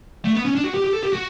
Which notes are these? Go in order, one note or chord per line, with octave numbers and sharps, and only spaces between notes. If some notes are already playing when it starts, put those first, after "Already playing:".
A3
B3
C#4
D4
F#4
G4
G4
A4
G4
F#4